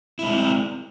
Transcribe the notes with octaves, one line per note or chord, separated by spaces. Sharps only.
G#3 C4 C#4 E4